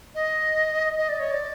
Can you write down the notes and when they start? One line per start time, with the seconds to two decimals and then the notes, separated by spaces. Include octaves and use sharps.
0.15 D#5
0.98 D#5
1.09 D5
1.20 C#5
1.31 D5